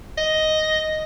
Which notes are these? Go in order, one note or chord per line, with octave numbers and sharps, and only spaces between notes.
D#5